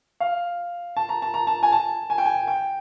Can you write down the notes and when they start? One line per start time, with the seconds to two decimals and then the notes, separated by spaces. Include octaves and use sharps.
0.20 F5
0.97 A5
1.09 A#5
1.22 A5
1.34 A#5
1.47 A5
1.63 G#5
1.72 A5
2.10 G#5
2.18 G5
2.25 G#5
2.47 G5